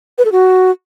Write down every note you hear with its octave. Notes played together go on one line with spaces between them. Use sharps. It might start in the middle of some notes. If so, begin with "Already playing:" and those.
B4
A4
F#4